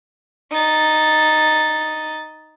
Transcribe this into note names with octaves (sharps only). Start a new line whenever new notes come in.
D#4 A6